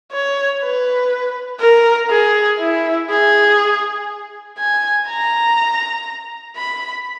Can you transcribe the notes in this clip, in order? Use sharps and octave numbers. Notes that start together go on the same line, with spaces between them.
C#5
B4
A#4
G#4
E4
G#4
G#5
A#5
B5